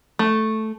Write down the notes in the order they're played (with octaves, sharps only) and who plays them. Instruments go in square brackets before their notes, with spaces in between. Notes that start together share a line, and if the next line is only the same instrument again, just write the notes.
[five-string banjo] A3